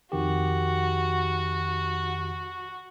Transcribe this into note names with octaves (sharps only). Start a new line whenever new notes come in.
F2 D#3 F#4 G4